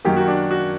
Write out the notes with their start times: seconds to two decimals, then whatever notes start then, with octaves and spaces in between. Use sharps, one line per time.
0.05 F#2 D#3 F#3 A#3 G4
0.17 F#4
0.28 D4
0.51 F#4